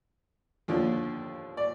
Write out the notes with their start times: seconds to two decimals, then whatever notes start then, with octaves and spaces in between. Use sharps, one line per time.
0.68 D#2 D3 F3
1.57 D5